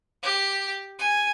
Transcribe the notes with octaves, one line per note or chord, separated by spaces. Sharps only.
G4
G#5